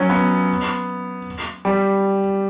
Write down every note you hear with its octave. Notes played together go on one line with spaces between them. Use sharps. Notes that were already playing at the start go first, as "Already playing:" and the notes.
Already playing: F#3 C#4
B3
G3